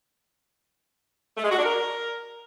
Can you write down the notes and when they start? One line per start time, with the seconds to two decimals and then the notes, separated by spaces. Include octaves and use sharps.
1.37 A3
1.44 G#3
1.51 F#4
1.58 D4
1.65 A#4